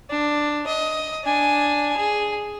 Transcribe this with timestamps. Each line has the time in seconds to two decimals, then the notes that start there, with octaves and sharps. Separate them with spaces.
0.10 D4
0.67 D#5
1.25 D4 G#5
1.97 G#4